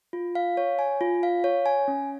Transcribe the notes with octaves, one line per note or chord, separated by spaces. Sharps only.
F4
F5
C#5
G#5
F4
F5
C#5
G#5
C#4